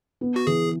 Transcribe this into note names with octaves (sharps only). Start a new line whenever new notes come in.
B3
F#4
E3 G#4